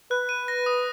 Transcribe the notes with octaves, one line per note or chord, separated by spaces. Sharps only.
B4 F#6
D#7
A#6
D#6